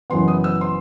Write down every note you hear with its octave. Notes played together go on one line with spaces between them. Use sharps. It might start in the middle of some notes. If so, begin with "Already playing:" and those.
F#1 F#2 E3 B3 C6
D#6
E6
C6